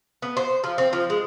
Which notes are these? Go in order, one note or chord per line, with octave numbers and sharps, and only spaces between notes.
B3
C5
F3
C4
F3
G#3